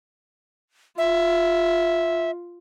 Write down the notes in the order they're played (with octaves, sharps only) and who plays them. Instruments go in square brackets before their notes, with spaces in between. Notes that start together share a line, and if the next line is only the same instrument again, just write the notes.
[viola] F4 [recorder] E5